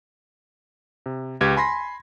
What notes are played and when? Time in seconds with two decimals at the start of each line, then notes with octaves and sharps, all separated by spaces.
1.06 C3
1.41 C#2 G4 B4 G#6
1.57 G#5 B5 C6 A#6